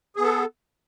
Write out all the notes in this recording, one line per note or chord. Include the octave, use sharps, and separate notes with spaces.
B3 G#4 A4